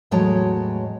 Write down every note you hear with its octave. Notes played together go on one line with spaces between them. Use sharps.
E2 A2 F#3 G#3 C#5 A5